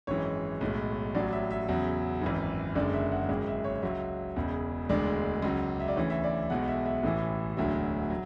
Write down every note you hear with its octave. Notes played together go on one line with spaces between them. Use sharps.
G#1 F#2 E3 G#3 C#5
B1 A2 G#3
A1 A2 F#3 D5
E5
E5
E2 C#3 F#3
G#1 F#2 E3
F#1 F#2 D3 G#3 D5
E5
F#5
G#1 F#2 C#3 G#3
E5
C#5
C#2 C#3 F#3 E5
E1 E2 C#3
E1 D2 D3 G#3 D5
C#2 C#3 F#3
E5
D5
D2 C#3 E3 C#5
E5
D5
B1 B2 G#3 F#5
E5
E5
A1 A2 E3
E1 D2 D3 F#3 E5
F#3